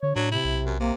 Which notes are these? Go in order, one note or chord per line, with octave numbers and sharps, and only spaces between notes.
D3 C#5
A2 F#3 D4
C3 E4
B1
F#2
C3 A#3